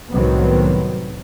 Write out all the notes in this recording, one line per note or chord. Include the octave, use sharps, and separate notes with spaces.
C2 A2 D#3 F#3 B3 C4